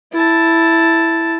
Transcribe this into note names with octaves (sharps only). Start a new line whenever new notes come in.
E4 A5